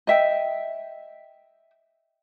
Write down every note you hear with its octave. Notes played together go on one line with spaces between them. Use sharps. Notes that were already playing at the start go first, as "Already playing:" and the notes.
D#5 E5 G5